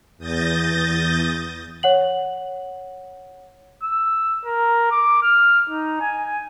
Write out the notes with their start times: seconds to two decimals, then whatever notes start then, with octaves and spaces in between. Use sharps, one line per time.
0.17 E2 D#6 G6 A6 A#6
1.83 C#5 F#5 F#7
3.83 E6
4.45 A#4
4.91 D6
5.22 F6
5.69 D#4
6.01 G#5